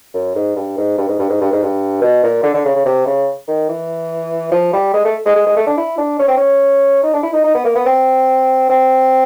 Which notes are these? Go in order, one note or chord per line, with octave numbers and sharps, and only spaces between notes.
F#2
G#2
G2
G#2
G2
G#2
G2
G#2
G2
G#2
G2
B2
A#2
D3
D3
C#3
C#3
C3
C#3
D#3
E3
F3
G3
G#3
A3
G#3
G#3
G#3
A3
D4
E4
D4
C#4
C4
C#4
D#4
D4
E4
D#4
D#4
B3
A#3
B3
C4
C4